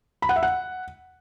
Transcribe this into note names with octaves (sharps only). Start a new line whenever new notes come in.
B5
F#5
E5
F#5